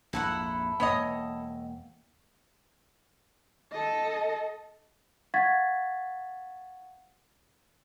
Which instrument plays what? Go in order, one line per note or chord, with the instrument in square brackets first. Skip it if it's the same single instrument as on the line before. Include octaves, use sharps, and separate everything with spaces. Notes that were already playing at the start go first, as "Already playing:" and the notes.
[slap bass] A#1 F2 G#2 [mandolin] E4 A4 F#5
[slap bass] E1 F2 A#3 [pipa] B3 C#5 D#5
[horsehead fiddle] A4 D#5
[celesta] F5 F#5 C#6 G#6 A6 B6